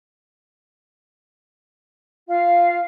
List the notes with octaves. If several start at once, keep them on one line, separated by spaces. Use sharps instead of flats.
F4 F5